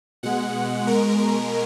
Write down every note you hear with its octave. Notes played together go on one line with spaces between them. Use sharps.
B2 G#3 F#5
B2 G#3 A#4
A#4